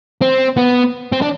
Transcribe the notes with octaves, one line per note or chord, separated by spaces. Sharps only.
C4
B3
C4
D4